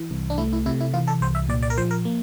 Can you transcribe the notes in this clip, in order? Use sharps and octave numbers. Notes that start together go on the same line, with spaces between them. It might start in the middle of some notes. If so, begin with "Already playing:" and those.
Already playing: E3
C2
D4
A3 E4
E4
C3 E4
E4
E3 F4
A4
C2 C5
E5
A#2 D5
D5
A#4
F3 C5
A#4
A#3